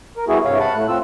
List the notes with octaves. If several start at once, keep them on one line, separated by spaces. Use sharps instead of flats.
A#4
G3 B3 E4 F#4 G#4
G2 C3 C#5 F5
F#5 A5 B5
A2 A3 F#6
C4 F4 E6